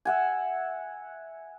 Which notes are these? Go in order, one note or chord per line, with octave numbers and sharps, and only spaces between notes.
E5 F#5 G#5